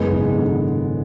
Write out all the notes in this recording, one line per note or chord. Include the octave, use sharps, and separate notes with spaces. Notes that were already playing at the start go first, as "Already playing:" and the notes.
Already playing: F#1 F#2 G#3 B3
G#1
D3